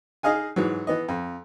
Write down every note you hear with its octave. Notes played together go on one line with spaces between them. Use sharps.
D#4 G#4 D#5 F5 G#5
G#2 E3 F#3
E3 B3 D#5
F2